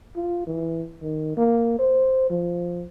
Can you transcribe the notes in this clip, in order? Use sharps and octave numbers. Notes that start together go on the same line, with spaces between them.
F4
E3
D#3
A#3
C5
F3